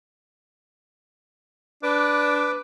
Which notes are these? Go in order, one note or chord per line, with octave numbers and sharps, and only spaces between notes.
D4 B4 D6